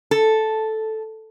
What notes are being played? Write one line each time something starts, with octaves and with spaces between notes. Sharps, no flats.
A4